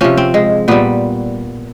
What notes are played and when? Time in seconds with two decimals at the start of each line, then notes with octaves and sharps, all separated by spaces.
0.01 C3 F3 C#4
0.17 C4
0.34 G#3
0.68 A#2 G3 B3